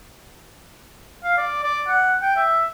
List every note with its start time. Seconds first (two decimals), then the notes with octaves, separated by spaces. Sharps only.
1.24 F5
1.37 D5
1.63 D5
1.88 F#5
2.22 G5
2.36 E5